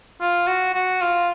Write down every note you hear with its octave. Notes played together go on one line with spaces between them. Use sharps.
F4
F#4
F#4
F4